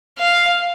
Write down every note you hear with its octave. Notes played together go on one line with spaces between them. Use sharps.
F5